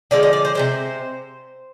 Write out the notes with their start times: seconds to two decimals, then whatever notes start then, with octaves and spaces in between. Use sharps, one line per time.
0.11 D3 F3 G#3 D5
0.23 D#5
0.33 D5
0.45 C5
0.55 C3 F3 G#3 C5